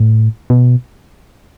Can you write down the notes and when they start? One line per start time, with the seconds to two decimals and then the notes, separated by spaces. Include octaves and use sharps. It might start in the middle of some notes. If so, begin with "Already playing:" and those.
Already playing: A2
0.50 B2